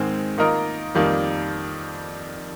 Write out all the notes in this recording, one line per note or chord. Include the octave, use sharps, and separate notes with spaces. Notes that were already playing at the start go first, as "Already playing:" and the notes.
Already playing: G#2 D#3 G#3 C4
D#3 A#3 F4 A#4 D#5
F2 D#3 G3 A#3